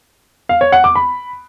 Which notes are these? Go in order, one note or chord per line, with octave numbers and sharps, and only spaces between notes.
F5
C#5
F#5
D6
B5